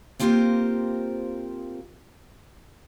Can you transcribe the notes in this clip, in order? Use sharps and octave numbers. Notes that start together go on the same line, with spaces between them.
A#3 C4 F4 G4 A#4 C5